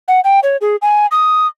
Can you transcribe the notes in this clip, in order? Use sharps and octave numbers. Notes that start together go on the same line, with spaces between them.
F#5
G5
C#5
G#4
G#5
D#6